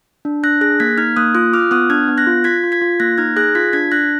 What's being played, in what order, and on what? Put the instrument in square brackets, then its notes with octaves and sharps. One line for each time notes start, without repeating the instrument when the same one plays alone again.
[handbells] D4
D4 F#6 A#6
G#4 F#6 A#6
A#3 G#6 B6
D#4 F6 G#6
A#3 D#6 F#6
F4 D#6 F#6
F4 D6 F6
B3 D#6 F#6
D4 F6 G#6
B3
F#6 A#6
F4
F4 G#6 B6
F4
G#6 B6
F4
A#3 F#6 A#6
D#4 F6 G#6
G#4 F#6 A#6
F4 G#6 B6
D4 G#6 B6
D4 F#6 A#6